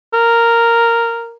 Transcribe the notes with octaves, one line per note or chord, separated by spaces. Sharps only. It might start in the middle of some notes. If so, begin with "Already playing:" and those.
A#4